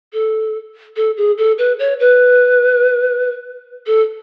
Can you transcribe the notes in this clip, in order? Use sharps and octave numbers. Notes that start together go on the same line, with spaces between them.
A4
A4
G#4
A4
B4
C#5
B4
A4